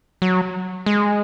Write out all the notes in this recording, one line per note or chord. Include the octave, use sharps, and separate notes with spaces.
F#3
G#3